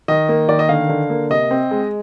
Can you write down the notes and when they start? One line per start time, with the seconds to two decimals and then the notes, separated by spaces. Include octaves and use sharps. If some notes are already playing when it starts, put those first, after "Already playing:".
0.08 D#3 D#5
0.29 A#3
0.49 D#3 D5
0.59 D#5
0.69 D3 F5
0.89 D3
1.10 A#3
1.30 C3 D#5
1.51 C4
1.71 G#3